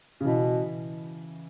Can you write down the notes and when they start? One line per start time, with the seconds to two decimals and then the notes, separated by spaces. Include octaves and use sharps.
0.20 C#3
0.25 B2 E3